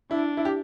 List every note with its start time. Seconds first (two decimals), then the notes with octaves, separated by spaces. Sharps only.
0.11 D4 E4
0.37 E4
0.45 G4